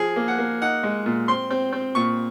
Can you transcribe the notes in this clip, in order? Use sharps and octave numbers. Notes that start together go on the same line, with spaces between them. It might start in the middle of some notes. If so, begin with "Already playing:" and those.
Already playing: F3 G#4
A#3
F#5
A#3
D#4 F#5
G#3
A#2
C4 C6
C4
C4
A#2 C#6